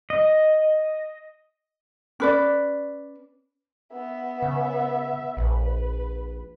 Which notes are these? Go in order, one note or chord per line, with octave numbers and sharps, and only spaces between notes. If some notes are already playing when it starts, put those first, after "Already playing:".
D#5
C#4 B4 D5
B3 E5
C#3
A#1 B4